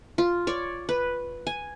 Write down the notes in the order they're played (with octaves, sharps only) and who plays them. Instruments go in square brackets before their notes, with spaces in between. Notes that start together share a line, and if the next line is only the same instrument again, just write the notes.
[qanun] F4
C#5 D5
B4
G#5